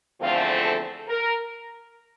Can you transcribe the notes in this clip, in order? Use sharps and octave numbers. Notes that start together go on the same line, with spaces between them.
E2 D3 F3 A3 C4 F4
A4
A#4